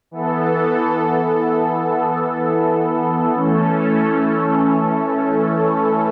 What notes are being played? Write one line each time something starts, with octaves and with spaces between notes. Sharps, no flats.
E3 B3 A4
E3 A3 C#4 A4